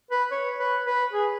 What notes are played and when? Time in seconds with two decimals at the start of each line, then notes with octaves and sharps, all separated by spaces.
0.11 B4
0.31 C#5
0.59 B4
0.86 B4
1.12 G#4